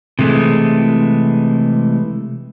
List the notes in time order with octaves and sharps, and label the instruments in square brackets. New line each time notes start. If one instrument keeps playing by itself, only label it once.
[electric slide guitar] C3 E3 G#3 A3